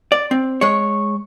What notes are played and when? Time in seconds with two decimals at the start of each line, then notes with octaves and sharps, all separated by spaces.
0.12 D5
0.31 C4
0.61 G#3 C#5 C#6